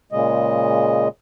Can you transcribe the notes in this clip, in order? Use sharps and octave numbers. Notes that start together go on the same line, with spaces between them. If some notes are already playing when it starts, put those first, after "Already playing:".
A#2 C#3 G#3 D#5